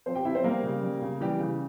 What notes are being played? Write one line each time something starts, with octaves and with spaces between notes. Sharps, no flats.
F3 C4 C5
G4 G5
C3 E4 E5
C4 C5
G3 A#3 A#4
C#3
G3
C#3
E3 G3 G4
C#3